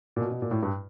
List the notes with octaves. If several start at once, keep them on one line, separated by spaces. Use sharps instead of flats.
A#2
B2
B2
A#2
A2
G2